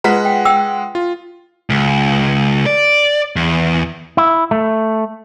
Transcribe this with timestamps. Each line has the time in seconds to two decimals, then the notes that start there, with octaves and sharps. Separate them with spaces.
0.04 G#3 F4 B4 F#5 A#5 B6
0.25 G5
0.45 G5 E6
0.95 F4
1.70 C#2
2.66 D5
3.36 E2
4.17 E4
4.51 A3